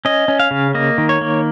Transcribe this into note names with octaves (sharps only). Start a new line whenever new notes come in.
C#4 D#5
C#4
F5
C#3
A#3 D#5
D#3
C#5
A#3